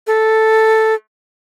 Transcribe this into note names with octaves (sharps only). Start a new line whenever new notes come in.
A4